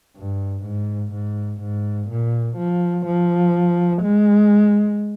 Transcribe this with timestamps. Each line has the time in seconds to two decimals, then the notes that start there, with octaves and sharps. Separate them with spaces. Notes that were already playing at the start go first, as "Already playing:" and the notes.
0.17 G2
0.64 G#2
1.13 G#2
1.61 G#2
2.10 A#2
2.57 F3
3.06 F3
4.02 G#3